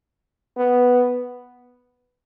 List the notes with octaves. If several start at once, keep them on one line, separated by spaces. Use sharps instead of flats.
B3